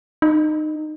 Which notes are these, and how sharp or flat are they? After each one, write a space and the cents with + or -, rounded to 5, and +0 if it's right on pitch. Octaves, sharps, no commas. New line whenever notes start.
D#4 -20